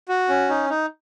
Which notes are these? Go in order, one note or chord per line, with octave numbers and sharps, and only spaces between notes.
F#4
C#4
D#4
D#4